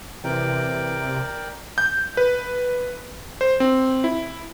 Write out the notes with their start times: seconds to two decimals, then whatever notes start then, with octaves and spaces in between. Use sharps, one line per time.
0.24 C3 E3 A#4 D5 G5
1.78 G6
2.17 B4
3.41 C5
3.60 C4
4.04 E4